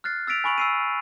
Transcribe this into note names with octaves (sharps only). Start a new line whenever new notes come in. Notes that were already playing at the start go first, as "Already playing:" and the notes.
F6 F#6 A6 C7
E6 A6 B6 D7 F7
G#5 B5 C#6 D7 F7 F#7
E6 C7 D#7